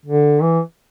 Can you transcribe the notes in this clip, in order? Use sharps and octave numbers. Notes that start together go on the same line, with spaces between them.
D3
E3